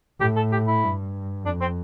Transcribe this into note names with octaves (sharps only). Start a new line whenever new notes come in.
A2 G4
A4
G4
E4
G2
F2 D4
C4